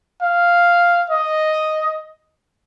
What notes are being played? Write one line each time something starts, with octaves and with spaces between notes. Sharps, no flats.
F5
D#5